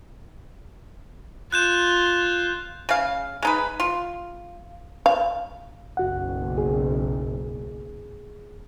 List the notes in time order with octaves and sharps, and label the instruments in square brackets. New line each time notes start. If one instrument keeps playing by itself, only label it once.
[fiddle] F4 [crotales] F#6 G6 E7
[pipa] C#3 F5
G#3 D#4 B4
F4
[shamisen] F5
[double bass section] F#1 B1 [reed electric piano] F#4 F#5
[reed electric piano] G#4